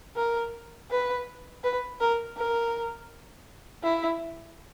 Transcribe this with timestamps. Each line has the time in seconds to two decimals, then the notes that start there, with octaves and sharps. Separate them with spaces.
0.16 A#4
0.90 B4
1.64 B4
2.00 A#4
2.37 A#4
3.83 E4